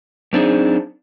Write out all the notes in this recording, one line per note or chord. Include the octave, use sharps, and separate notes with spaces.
F#2 C4 D4 D#4 G#4